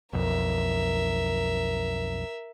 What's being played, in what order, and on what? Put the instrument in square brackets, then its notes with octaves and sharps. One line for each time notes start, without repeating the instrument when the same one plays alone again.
[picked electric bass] B1 F2 [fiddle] A#4 E5